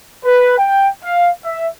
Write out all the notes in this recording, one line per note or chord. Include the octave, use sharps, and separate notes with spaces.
B4
G5
F5
E5